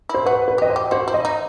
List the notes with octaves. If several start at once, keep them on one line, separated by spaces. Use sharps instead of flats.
E4
C5
F#4 B4
B4
G4 D#5
C5
G4
F#4 C5
E4
D#5
D#4